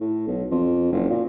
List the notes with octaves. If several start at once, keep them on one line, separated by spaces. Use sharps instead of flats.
A2
B1
F2
F#1
A#2